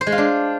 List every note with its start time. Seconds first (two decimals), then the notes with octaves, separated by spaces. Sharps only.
0.01 C5
0.07 G#3
0.12 F4
0.18 D4